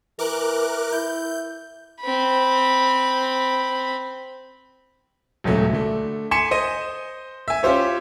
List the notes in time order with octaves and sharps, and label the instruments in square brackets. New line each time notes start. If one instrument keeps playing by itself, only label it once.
[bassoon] E3 [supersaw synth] A#4 D6 F#6
[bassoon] E4 [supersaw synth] G6
[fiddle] C4 B5
[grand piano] D#1 C#2 F#3 A3
D3 A3
G#5 C6 B6 C#7 E7
C5 D#5 D#7
E5 G#5
C#4 F4 G4 C5 C#5